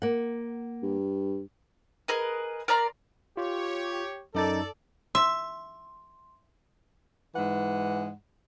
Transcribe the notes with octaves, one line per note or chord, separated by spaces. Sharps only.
A#3 F#5
G2
G#4 A#4 B4 D#5
A#4 D5 A#5 C6
F4 G4 C#5
F#2 D#4 A4 D5 A6
E5 C6
G#2 E3 F#5